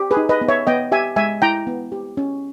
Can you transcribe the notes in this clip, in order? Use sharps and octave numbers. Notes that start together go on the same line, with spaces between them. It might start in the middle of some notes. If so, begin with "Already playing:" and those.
Already playing: G4
G#4 B4
D#4
B4 D#5
B3
C#5 E5
B3 D#5 G5
G4 E5 G#5
G#3 E5 G#5
E4 G5 A#5
B3
G4
C#4